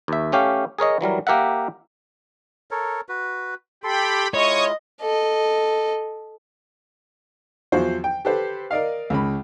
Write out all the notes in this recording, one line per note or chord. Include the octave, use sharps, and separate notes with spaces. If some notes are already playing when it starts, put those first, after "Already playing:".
D#2 E5
A3 C#4 G4 F5
G#4 A#4 C#5 D#5
E3 F#3 G3 A#4
A#3 G4 A#4 E5 F#5
A4 A#4 C#5
F#4 B4
G4 A4 G5 B5 C6
G#3 E4 F4 C#5 D#5 C#6 D#6
A4 D#5
E2 F3 F#3 F#4 C5
G5
G4 A4 B4 C5
A#4 D5 D#5 F5
C#2 C#3 B5